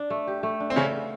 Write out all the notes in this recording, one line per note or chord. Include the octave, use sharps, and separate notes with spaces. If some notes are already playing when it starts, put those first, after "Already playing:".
Already playing: D4
A3
G4
A3
D4
C4
C#3 C#4 A4
B3